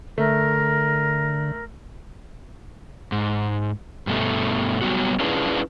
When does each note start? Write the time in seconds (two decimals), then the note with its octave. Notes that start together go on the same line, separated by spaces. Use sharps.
0.18 D3 A3 A#4
3.12 G#2
4.07 G2 B2 A3
4.81 F#3 G3 B3 F#4
5.20 C#4 D4 E4 F4 G#4 B4